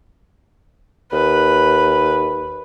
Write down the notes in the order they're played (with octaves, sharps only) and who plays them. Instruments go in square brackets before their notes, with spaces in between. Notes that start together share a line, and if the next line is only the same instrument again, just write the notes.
[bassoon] D#2 [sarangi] B4